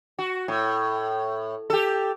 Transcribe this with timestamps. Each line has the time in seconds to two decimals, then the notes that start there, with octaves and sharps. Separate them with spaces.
0.18 F#4
0.48 A2
1.70 G4 A4